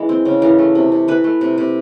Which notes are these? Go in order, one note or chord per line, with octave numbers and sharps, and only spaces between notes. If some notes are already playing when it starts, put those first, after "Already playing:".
Already playing: E3 G#3
C4
C#3
E3 A#4
A3
C3
C3
E3 B4
A3
C3
C3